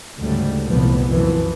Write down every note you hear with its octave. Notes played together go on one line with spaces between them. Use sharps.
D2 G#2 C#3 G3 A3
F1 C2 A#2 E3 F3 B3
F#2 E3 F3